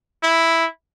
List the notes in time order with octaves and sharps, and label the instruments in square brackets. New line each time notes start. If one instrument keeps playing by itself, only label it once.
[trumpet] E4